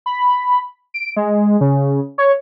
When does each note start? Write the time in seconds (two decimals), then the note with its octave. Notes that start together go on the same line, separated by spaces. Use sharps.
0.06 B5
0.94 D7
1.16 G#3
1.61 C#3
2.18 C#5